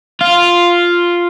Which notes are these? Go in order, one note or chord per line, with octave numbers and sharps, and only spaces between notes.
F4